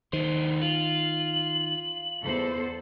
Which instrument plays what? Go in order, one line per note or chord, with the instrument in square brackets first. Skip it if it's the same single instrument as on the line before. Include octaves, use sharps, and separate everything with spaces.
[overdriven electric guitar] D#2 C5 [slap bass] D#3
[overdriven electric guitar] F4 [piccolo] F#7
[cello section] E2 A4 C5